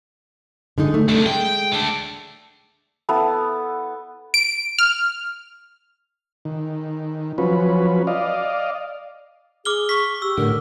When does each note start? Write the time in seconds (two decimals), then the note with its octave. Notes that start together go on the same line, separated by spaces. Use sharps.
0.78 D3 G#3 D#4
0.94 A3
1.09 C3 A3 D4
1.26 G#3 G5
1.72 A3 D4
3.09 B3 E4 A4
4.34 D7
4.79 F6
6.45 D#3
7.38 F3 F#3 C#4 B4
8.07 D5 D#5 F5
9.65 G#4 D6 F6 G7
9.89 C#6 B6
10.22 G4 E6
10.37 A2 D3 A#4